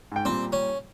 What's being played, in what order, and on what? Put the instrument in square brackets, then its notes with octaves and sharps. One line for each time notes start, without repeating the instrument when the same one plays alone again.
[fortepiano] G#2 G5
[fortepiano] A#2 G3 [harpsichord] C4
[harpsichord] C#4